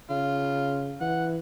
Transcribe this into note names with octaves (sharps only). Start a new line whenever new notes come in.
C#3 F4
E3 F#5